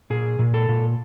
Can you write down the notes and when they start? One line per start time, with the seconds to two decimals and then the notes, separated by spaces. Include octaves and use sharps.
0.10 A#2 G#4
0.39 A#2
0.54 A4
0.69 A#2